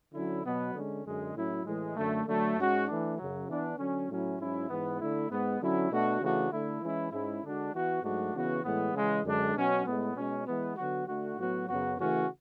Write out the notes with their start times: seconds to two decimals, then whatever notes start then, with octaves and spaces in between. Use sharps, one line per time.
0.14 D3 F#3 C#4 E4
0.44 B2 F#3 B3
0.74 D3 G#3 C#4
1.05 F#2 D3 G#3
1.35 A2 F#3 C#4 E4
1.65 A2 E3 G#3
1.96 F#2 D3 A3
2.26 D3 F#3 A3
2.57 G#2 G#3 C#4 F#4
2.87 E3 A3 D4
3.17 F#2 C#3 F#3
3.48 E3 B3 D4
3.78 D3 F#3 C#4
4.08 A2 F#3 C#4 E4
4.39 G#2 F#3 C#4 E4
4.69 G#2 E3 B3
5.00 D3 A3 E4
5.29 G#2 G#3 B3
5.60 D3 F#3 C#4 E4
5.90 B2 A3 D4 F#4
6.21 C#3 E3 A3 D4 F#4
6.51 D3 A3 E4
6.82 E3 G#3 C#4 E4
7.12 G#2 G#3 C#4 E4
7.42 D3 G#3 D4 F#4
7.72 E3 B3 F#4
8.03 G#2 F#3 A3 D4 F#4
8.34 C#3 E3 B3 F#4
8.64 A2 E3 G#3 B3
8.94 C#3 E3 G#3
9.24 F#2 D3 G#3 D4
9.55 B2 F#3 C#4 F#4
9.85 A2 G#3 B3
10.16 B2 G#3 C#4
10.46 E3 G#3 B3
10.76 D3 F#3 B3 F#4
11.07 D3 A3 D4 F#4
11.37 A2 F#3 B3 F#4
11.67 F#2 C#3 F#3 B3 F#4
11.98 C#3 E3 A3 C#4 F#4